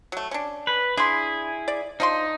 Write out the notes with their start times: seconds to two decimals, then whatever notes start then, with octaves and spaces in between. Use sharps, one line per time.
0.12 F#3 A3
0.31 C#4 D4
0.67 B4
0.97 D4 E4 G#4 C6
1.68 D5
2.00 F3 D4 D#4 C6